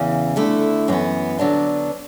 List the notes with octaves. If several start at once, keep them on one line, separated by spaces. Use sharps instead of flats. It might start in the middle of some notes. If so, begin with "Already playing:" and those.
Already playing: E2 C#3 E3
D3 A3 E4
F#2 E3 B3
D3 F#3 B3 D4